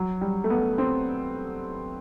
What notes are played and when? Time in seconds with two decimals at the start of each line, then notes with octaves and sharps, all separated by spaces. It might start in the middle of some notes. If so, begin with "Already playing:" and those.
Already playing: F#3
0.21 G3
0.44 A3
0.50 B3
0.78 C4